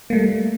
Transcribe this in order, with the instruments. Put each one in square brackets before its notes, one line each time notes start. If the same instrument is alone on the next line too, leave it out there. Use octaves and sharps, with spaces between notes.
[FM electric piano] A#3
A3
G3